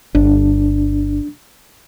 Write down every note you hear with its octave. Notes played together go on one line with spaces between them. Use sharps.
G1 D4